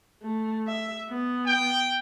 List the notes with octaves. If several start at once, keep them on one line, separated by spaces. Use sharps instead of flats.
A3
E5
B3
G5